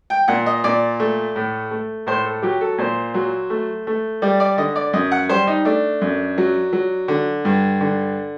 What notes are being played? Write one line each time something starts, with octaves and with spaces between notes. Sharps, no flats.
G5
A#2 F#5
D#5
A#2 D5
A3
A2
A3
A2 C5
A4
F#3 G4
A4
A#2 C5
F#3
A3
A3
G3 D5
D5
D3 D#5
D5
F#2 D#5
F#5
G3 C5
D#4
A3 D4
F#2
F#3
F#3
D3
G2
D3